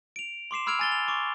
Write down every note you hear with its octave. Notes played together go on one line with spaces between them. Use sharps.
D7 F7
C6 D6 C7 E7
B5 E6 F6 G#6 D7 F7
G#5 A6 G7
F7
C#6 D6